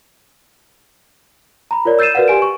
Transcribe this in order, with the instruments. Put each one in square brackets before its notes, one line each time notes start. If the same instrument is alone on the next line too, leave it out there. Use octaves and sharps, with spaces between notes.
[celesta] A#5 B5
F4 A#4 C#5 D5
E6 G6 A6 C7 D#7 E7
F#4 A#4 B4 D5 F5 F#5
G4 G#5 D7
C#6